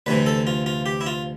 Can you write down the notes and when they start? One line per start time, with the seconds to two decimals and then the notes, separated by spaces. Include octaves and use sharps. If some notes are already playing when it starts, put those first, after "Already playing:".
0.06 D2 C3 E3 B4
0.26 A4
0.47 F4
0.66 F4
0.86 G4
1.01 E4
1.06 F4